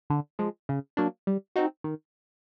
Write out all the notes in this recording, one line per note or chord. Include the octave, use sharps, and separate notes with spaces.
D3
F3 G#3
C#3
F#3 A#3 D4
G3
C4 D#4 F#4
D#3